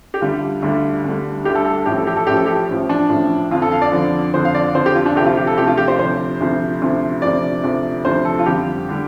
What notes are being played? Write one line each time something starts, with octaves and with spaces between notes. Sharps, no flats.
G4
D2 D3 G3 F4
D2 D3 G3
D2 D3 G3
D2 D3 G3 G4
A4
A4
A1 A2 F3 G4
A4
G4
A4
A1 A2 F3 G4
A4
G4
A1 A2 F3
D4
A1 A2 F3
F2 D3 F3 F4
A4
F5
D5
F2 D3 F3
F2 D3 F3 C5
F5
D5
F2 D3 F3 C5
G4
F4
D4
D2 C3 F3 G4
F4
G4
A4
D2 C3 F3 G4
F4
G4
C5
D2 C3 F3 C5
D2 C3 F3
D2 C3 F3
D2 C3 F3 D5
D2 C3 F3
D2 C3 F3 C5
A4
F4
F2 D3 G3 G4
D3 G3